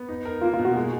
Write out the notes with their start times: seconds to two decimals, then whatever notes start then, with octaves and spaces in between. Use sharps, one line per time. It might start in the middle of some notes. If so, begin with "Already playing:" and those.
Already playing: B3
0.09 D#4
0.25 A#4
0.42 A#3 F4
0.53 F4
0.59 B2
0.65 F#4
0.76 G#3